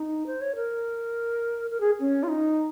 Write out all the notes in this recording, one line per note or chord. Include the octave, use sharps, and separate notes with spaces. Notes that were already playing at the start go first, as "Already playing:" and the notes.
Already playing: D#4
C5
C#5
A#4
A#4
G#4
C#4
F4
D#4